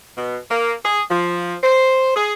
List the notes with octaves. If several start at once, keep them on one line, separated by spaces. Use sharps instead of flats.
B2
A#3
G#4
F3
C5
G#4